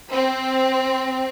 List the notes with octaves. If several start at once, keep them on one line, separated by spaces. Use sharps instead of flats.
C4